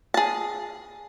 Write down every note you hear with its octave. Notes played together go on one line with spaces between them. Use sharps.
G#4 A5